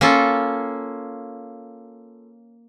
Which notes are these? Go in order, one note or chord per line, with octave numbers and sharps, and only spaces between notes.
A#3 C#4 F4 A4